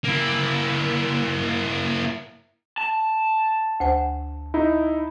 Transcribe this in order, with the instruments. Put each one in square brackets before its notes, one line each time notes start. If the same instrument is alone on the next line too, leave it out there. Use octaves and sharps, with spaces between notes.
[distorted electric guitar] A#3 E4
[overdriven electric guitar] A5
[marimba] D2 C5 G#5
[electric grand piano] D#4 E4